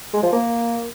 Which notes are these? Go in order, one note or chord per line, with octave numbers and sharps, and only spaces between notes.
G#3
F3
A#3